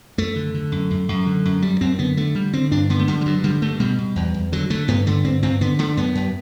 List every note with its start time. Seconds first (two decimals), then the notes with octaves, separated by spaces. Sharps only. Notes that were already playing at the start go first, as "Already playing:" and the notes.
0.18 F#2 A3
0.36 D3
0.54 D3
0.72 F#2
0.91 F#2
1.09 F#2
1.26 D3
1.45 F#2
1.62 F#2 G3
1.81 F#2 C4
1.99 D3 B3
2.17 D3 A3
2.35 D3 G3
2.53 D3 C4
2.71 G2 D4
2.90 D3 B3
2.99 A3
3.08 D3 G3
3.21 G3
3.26 G2 F#3
3.44 D3 G3
3.62 G2 A3
3.80 B2 G3
3.99 B2
4.16 E2
4.34 E2
4.52 D3 F#3
4.70 D3 A3
4.88 G2 B3
5.07 D3 A3
5.25 G2 C4
5.43 G2 C4
5.61 D3 B3
5.79 D3 A3
5.97 F#2 B3
6.15 F#2